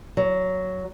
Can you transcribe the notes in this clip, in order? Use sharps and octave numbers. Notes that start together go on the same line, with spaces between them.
F#3